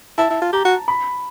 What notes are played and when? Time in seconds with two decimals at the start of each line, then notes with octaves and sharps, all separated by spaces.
0.18 E4 A5
0.30 E4
0.41 F4
0.53 G4 A#5
0.65 F#4
0.88 B5